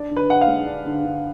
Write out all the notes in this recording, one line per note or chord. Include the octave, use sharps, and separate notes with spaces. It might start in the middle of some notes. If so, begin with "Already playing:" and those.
Already playing: D4 D5
D3
B4
D3 F#5
F5
G#3
D4
D3
D3